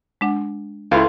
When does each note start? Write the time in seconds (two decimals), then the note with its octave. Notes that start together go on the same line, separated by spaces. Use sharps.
0.21 G#3 D4 F#5
0.91 C#2 E4 F4 A4 B4 F5 C6